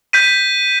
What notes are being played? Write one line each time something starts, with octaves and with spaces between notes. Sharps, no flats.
G6 B6 D#7